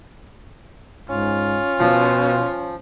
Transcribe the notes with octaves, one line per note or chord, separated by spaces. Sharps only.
G#2 C#4 F4
B2 F3